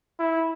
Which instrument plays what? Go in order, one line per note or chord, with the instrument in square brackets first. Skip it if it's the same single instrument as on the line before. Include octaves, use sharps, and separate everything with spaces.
[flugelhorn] E4